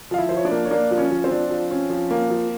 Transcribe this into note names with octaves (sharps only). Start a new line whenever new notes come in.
F3 F5
E4 E5
F3 C5
C#5
D4 D5
A#3
C#5
A#3 D4 D5
F3
C#4 C#5
F3
C4 C5
D4
F3
C#4
F3
A#3
F3